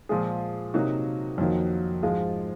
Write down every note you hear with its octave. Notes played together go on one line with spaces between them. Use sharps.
A#2 F3 G#3 F4 G#4
C3 F#3 A#3 D#4 F#4
F2 D#3 F#3 A#3
G#2 F3 G#3 F4